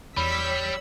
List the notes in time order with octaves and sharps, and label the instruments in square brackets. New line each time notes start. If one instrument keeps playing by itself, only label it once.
[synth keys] E2 [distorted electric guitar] G3 [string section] C#5 E6 B6 [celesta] B5